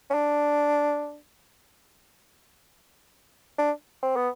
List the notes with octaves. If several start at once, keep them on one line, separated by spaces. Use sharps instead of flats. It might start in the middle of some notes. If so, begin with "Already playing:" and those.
C#4
D4
D4
C4
B3